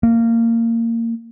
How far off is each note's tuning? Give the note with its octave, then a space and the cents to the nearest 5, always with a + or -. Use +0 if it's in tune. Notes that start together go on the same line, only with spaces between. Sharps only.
A#3 -20